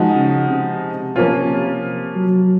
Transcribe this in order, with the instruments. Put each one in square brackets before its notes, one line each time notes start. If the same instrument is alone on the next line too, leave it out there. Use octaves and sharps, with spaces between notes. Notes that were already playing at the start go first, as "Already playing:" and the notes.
Already playing: [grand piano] F3 G#3 D#4 F#4
[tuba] C#3
C3
[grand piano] F3 A#3 C#4 F4
[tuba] C3
F#3